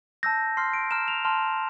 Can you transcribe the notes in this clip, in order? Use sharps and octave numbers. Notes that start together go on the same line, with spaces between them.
A5 E6 G6 A#6
C6 F6 C7
D7
A#5 F6 E7
F7
A5 C6 F6